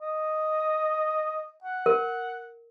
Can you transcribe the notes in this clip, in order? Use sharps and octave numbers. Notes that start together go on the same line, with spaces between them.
D#5
F#5
A#4